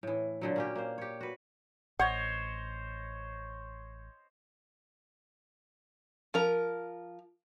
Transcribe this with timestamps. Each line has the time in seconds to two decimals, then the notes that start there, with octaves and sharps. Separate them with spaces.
0.03 A2 E3
0.41 A#2 D3 F#3
0.56 A#3 C#4 G4
0.75 A#3 C5
0.98 G4 C#5
1.21 F#4 B4
1.99 A1 C5 C#5 D#5 F#5
6.34 F3 A#4 A#5